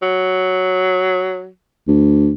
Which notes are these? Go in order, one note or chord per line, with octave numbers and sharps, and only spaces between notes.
F#3
D2